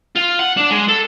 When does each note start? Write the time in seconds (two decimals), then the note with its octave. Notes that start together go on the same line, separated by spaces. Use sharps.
0.16 F4
0.39 F#5
0.57 D4
0.71 G#3
0.88 A4